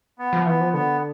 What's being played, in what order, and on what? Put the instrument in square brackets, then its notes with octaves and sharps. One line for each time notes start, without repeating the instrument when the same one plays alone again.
[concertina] B3
[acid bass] F3
[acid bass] E3 [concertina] B3
[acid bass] F3
[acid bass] D3 [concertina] B3